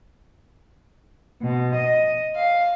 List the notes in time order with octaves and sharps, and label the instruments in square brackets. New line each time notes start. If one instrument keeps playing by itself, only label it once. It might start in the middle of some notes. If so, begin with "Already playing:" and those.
[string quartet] B2
D#5
F5